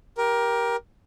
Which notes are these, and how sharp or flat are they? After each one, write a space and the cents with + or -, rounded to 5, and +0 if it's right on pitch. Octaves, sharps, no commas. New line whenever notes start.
G4 +0 A#4 +20